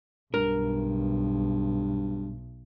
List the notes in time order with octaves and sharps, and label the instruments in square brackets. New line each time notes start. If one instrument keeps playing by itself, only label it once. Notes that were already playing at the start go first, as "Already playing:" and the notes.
[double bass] B1 [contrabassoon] G2 [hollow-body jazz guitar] A#4